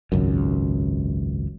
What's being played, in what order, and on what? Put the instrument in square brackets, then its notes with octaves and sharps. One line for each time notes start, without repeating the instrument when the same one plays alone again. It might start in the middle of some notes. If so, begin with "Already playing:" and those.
[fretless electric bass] G#1 C#2 F#2